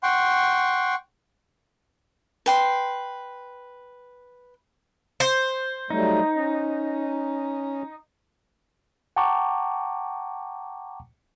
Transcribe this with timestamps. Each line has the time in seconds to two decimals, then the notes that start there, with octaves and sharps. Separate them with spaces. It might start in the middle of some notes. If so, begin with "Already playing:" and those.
0.03 F#5 G5 C6 C#6
2.46 B4 G5 C6
5.20 C5
5.90 F#3 G3 A3 D#4
6.36 C#4
9.16 F#5 G5 A5 A#5 C#6 D6